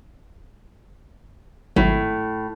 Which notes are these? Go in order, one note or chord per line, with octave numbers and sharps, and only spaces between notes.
G#1 A2 F#3